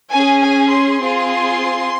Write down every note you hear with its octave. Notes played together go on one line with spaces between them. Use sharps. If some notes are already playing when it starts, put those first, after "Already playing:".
C#4 G#4 G#5
G#5
C6
C4 F4 G#4